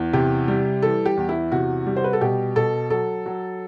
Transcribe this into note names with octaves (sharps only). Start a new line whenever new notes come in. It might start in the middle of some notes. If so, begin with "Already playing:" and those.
Already playing: E2
C3 G4
G3
E3 A4
G4
E2
E4
C3 F#4
G3
C5
B4
A4
B2 G4
B2 A4
F#3 A4
F#3